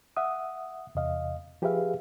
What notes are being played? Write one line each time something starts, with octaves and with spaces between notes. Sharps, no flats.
E5 F#5 D#6
E2 C3 D#5 F5
F3 G4 G#4 B4 E5 F5